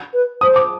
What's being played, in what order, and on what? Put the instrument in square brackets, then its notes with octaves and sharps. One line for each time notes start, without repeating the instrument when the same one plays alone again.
[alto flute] B4
[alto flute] C5 [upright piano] D#6
[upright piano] D6